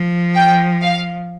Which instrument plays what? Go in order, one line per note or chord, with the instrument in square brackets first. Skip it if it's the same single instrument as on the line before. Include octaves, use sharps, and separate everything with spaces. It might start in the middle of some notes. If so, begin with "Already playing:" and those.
Already playing: [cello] F3
[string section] G5
F5